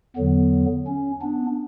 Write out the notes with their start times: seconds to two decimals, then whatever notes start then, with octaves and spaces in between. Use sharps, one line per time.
0.16 E2 D3 F#3 B3
0.87 C#4
1.22 B3 D4